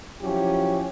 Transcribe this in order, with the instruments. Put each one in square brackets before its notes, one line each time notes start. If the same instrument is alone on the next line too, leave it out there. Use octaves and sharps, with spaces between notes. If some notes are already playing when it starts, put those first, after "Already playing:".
[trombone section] F3 F#3 C#4 E4 G4